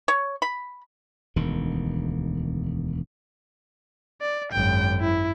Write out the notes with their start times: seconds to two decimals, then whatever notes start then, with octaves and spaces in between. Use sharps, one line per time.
0.08 C#5
0.42 B5
1.36 E1 D2 D#3
4.21 D5
4.52 G#1 F#2 G5
5.00 E4